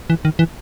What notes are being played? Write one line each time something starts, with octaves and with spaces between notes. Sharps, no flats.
E3
D#3
E3